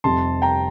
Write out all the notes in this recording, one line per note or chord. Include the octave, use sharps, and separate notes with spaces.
F1 F2 C3 G3 A5 C6
G5 A#5